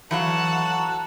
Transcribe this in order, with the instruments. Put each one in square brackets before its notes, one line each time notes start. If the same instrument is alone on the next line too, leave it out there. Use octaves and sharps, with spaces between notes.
[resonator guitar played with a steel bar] E3 F#3 F5 [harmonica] F#4 A4 [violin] F#5 E7 [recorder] A#5